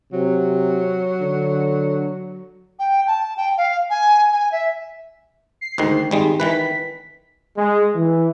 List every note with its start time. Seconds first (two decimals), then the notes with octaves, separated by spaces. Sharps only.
0.13 C3 F#3
1.21 D3
2.79 G5
3.07 A5
3.37 G5
3.57 F5
3.90 G#5
4.32 G#5
4.52 E5
5.61 C7
5.78 D2 G#2 D#3
6.11 G#1 D#3 G3 G#3
6.40 D#3 E3 B4 B6
7.57 G#3
7.96 E3